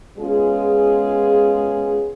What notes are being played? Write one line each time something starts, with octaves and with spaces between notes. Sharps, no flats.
G#3 B3 C#4 F4 G#4